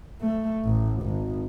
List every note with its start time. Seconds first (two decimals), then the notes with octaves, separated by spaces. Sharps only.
0.21 A3
0.64 A1
1.02 G#1